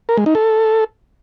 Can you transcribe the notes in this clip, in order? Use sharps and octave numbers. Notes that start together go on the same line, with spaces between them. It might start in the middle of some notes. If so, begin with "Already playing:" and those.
A#4
G#3
D#4
A4